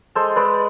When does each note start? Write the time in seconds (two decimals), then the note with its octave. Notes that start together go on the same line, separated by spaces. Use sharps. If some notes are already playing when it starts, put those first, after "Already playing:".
0.15 G#3 A4 C5
0.36 G#3 B4 D5